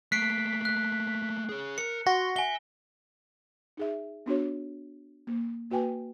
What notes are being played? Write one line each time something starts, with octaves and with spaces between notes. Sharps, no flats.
A3 A#3 F#6 B6 C7 D7
F#6
C#4 G#4
A#4 C#7
F#4 C6 A#6
E5 G#5 G7
D#4 G#4 E5
B3 D4 F#4 C#5
A#3
A#3 F#4 B4 G5 G#5